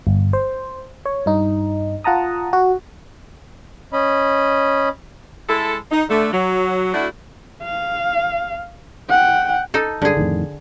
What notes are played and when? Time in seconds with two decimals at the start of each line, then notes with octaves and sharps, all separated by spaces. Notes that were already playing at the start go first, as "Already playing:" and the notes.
0.07 G1
0.33 C5
1.06 C#5
1.26 G2 D#4
2.04 F4 F#5 A5 A#5 D#6
2.53 F#4
3.93 C#4 D#5 B5
5.48 G#3 E4 A4
5.91 D#4
6.09 D3 A3
6.32 F#3
6.93 A3 D4 E4 F#4
7.63 F5
9.10 F#5 G5
9.74 D#4 A4
10.02 G2 D3 G#4
10.17 F2 A2 D#3